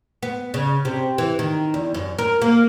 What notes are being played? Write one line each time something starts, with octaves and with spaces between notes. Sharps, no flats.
B3
C#3
C3
E3
D#3
E2
F#2
A#4
A#3